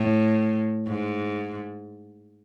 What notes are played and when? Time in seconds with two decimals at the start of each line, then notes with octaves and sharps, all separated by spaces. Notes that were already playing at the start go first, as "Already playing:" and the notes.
Already playing: A2
0.87 G#2